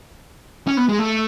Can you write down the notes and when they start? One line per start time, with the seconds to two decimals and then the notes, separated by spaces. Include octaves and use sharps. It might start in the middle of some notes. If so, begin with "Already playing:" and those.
0.67 C#4
0.77 B3
0.89 G#3
0.99 A3